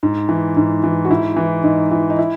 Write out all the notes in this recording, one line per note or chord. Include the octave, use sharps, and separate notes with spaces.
G#2
E3
G#2
E3
F#4
G#2 E4
E3
G#2 D#4
E3
D#4
E4